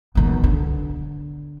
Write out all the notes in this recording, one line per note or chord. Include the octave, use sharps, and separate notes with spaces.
B1 D#3
D3